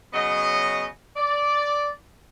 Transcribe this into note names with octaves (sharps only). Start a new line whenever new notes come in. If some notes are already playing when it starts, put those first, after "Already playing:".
C#3 F#3 B3 D#5
D5